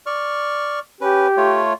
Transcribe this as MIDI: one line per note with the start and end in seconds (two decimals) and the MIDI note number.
0.06 0.79 74
0.06 0.79 85
0.06 0.79 89
1.01 1.28 61
1.01 1.60 67
1.01 1.28 71
1.37 1.73 57
1.37 1.73 65
1.37 1.73 73